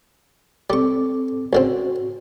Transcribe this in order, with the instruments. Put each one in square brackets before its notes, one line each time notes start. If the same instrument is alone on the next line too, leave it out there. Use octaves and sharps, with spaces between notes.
[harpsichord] G3 C#6 [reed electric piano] C4 A4 D6
[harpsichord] C#2 D3 C4 [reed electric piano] F#4